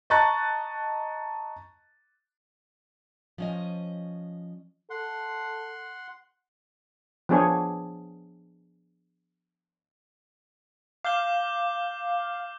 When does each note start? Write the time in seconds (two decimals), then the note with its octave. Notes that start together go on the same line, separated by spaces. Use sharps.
0.10 D#5 A5 A#5 C#6 F#6 A6
3.38 F3 C#4 D#5
4.90 A4 F#5 C6
7.29 F3 B3 D4 G#4 C5 C#5
11.04 F5 D6 G6 G7